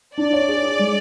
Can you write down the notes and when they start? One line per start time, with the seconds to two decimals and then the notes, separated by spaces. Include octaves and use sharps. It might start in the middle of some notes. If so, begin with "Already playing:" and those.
0.18 D4 D5
0.33 C#5
0.49 G#4
0.64 G#4
0.79 G#3